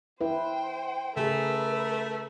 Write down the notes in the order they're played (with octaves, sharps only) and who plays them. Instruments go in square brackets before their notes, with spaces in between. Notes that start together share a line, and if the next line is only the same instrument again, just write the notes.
[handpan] E4 B4 [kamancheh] C5 G5
[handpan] C#3 G#4 [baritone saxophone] A3 [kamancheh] A#4 B4